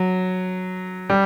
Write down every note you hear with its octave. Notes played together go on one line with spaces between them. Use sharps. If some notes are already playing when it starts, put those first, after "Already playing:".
Already playing: F#3
G3